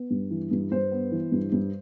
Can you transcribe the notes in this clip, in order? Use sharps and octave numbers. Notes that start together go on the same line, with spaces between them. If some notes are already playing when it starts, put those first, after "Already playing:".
Already playing: B3
G2
E3
G2
G2 C5
B3
E3
G2
G2